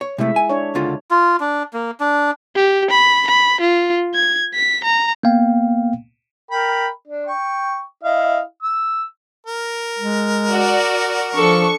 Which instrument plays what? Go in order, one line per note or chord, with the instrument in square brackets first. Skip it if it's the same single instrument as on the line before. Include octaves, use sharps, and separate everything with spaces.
[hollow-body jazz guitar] C#5
[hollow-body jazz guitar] C3 A3 [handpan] G#3 E4 E5
[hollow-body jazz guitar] G#5
[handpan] D4 C#5
[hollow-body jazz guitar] C#2 D3 F4
[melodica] F4
D4
A#3
D4
[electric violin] G4
B5
B5
F4
G#6
B6
A#5
[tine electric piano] A#3 B3 F5 G5
[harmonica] A#4 G5 B5
D4
G5 C#6
E4 D#5 F5
E6
A#4
[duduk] G#3
[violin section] F#4 D5
[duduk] F3 [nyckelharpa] D4 A4 [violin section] C#6